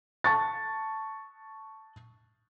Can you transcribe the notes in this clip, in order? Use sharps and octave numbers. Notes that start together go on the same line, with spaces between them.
A5 C#6 A6